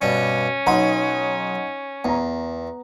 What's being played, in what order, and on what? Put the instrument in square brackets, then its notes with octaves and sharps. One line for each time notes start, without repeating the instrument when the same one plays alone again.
[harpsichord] G2 B2 D4 [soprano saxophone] C#4
[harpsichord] B1 F#3 B5 [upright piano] D#4 F#5 C6
[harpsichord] E2 [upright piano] B3 A#5